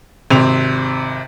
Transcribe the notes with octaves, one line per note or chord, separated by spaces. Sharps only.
G#1 C3 C4 F7